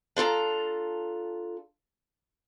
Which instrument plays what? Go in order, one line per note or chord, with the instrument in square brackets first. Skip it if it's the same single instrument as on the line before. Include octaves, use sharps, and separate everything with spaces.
[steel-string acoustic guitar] D4 F4 A4 A#5